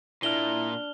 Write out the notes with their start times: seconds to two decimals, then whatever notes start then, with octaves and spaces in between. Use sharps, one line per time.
0.23 A#2 D4 E4 F6 F7 G7